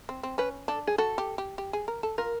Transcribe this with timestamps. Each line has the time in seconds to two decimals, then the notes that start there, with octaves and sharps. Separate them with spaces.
0.09 C4
0.23 C4
0.38 C#4 B4
0.68 D4 A4
0.87 G#4
0.98 F#4 A4
1.18 G4
1.38 G4
1.58 G4
1.73 G#4
1.88 A#4
2.03 A4
2.18 F4 A#4